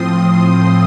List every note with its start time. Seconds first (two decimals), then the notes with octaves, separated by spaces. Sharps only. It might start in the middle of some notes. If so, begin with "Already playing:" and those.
Already playing: A2 F3 C4 C6 D#6
0.22 C6 D#6